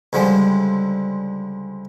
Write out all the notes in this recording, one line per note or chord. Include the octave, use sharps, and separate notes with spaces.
C#2 D3 F3 G3 G#3